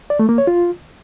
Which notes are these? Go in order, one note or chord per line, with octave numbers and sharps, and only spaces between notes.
D5
A3
A#3
C#5
F4